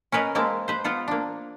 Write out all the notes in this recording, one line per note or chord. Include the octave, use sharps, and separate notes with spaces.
C#4 A#4 B4 D#5
G#3 A#3 C4 A5
B4 C5
B3 F4 C5 F#5
A#3 D4